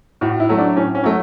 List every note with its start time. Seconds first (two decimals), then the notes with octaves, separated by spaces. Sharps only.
0.21 A2 F#4
0.40 E4
0.49 F#3 A3
0.58 D4
0.76 A2 C#4
0.95 C#4
1.04 F#3 A3